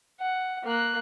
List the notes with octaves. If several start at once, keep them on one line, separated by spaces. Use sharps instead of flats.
F#5
A#3 F#6